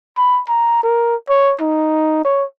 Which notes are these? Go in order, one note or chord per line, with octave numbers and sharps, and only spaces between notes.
B5
A#5
A#4
C#5
D#4
C#5